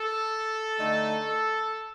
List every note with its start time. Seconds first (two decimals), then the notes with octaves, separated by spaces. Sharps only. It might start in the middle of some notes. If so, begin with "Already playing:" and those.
Already playing: A4
0.79 D3 A3 D#4